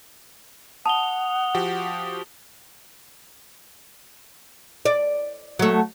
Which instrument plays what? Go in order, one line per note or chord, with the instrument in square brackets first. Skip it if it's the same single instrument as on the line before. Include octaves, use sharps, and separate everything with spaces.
[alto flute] F#5 [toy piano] A5 [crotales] D#6 F7 G7
[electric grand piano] F3 F#4 G4
[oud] D5
F#3 A3